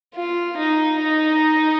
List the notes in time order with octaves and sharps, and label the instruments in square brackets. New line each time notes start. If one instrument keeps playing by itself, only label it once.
[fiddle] F4
D#4
D#4